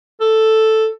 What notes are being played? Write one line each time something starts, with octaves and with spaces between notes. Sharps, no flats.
A4